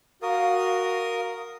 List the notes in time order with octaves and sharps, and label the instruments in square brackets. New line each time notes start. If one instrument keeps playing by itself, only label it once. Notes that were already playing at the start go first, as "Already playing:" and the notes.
[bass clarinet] F#4 [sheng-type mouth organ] A#4 D#6 [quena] F5